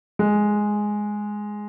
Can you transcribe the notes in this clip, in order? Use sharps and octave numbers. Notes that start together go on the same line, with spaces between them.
G#3